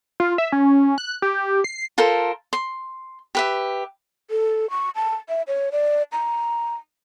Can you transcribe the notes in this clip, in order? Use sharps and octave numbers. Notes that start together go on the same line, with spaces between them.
F4
E5
C#4
F#6
G4
C7
F4 A4 A#4 C5
C6
G4 B4 E5
A4
C#6
A5
E5
C#5
D5
A#5